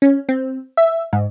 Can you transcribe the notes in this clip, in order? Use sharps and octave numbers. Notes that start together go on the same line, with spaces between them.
C#4
C4
E5
G#2